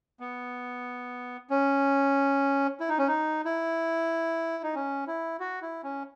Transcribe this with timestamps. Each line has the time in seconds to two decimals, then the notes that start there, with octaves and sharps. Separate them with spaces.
0.20 B3
1.50 C#4
2.80 E4
2.89 D#4
2.98 C#4
3.08 D#4
3.45 E4
4.63 D#4
4.75 C#4
5.07 E4
5.40 F#4
5.62 E4
5.84 C#4